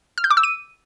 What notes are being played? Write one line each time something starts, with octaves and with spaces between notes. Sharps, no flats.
F6
G6
D6
E6
D#7